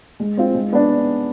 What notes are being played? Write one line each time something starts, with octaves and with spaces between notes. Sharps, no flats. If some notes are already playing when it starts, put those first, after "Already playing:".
G#3
C4 F4
G#3
B3 D4